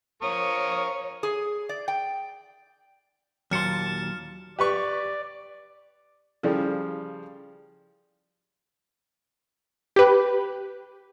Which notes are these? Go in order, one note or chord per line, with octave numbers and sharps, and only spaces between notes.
F3 A#4 C#5 C#6 D#6
G#4
D5
G5
D#2 A#2 F#3 A5 C6 F6 C#7
G4 B4 D5 C#6
C#3 F3 G3 E4 G#4 A4
G4 B4